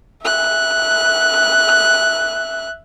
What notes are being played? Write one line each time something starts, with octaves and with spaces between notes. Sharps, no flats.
E5 F#6